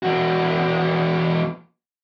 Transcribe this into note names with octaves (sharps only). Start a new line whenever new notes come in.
E2 F#4